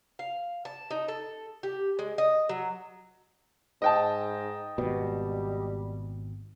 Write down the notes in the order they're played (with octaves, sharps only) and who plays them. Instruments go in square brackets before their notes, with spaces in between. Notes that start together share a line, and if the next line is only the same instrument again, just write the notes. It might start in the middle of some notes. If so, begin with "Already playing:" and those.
[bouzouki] F5
A5
D#4
A4
G4
G#3
D#5
F#3
[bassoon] G#2 [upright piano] D#5 G5 A5
[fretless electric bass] G#1 B2 [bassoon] G3